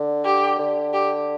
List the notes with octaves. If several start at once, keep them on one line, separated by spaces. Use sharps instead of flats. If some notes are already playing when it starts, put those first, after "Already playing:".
Already playing: D3
G4
D3
G4